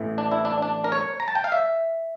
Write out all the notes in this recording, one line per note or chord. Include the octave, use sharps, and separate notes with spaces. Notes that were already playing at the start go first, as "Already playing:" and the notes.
Already playing: A1 A2 E3
D4
E4
D4
D4
A#4
C#5
A#5
A5
G5
F5
E5